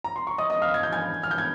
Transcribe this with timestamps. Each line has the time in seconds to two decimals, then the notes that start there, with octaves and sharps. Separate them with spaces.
0.04 A#5
0.16 C6
0.27 C#6
0.38 D#5 D#6
0.50 D#5 D#6
0.62 F5 F6
0.74 G#6
0.83 G6
0.92 G#5 G#6
1.23 F6
1.31 G6
1.38 G#6